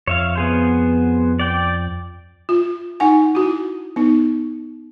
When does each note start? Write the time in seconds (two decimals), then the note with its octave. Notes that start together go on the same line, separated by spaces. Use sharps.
0.08 F2 C#5 E5 F5
0.35 B3 G#4 C5
1.40 D5 G5
2.49 F4
3.00 D#4 F#5 G#5
3.35 E4 F#4
3.96 B3 D#4